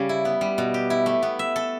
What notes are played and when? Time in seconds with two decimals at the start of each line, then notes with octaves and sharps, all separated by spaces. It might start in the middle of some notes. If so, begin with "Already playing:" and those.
Already playing: C#3 G3 G4
0.09 E4
0.25 B3
0.41 G3
0.58 B2
0.74 G4
0.90 E4
1.06 A3
1.23 B3
1.39 E5
1.56 A4